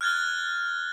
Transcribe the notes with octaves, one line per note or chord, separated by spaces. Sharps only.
F6 F#6 G#6 A6 G7